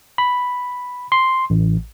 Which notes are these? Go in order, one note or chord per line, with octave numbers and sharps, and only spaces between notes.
B5
C6
A1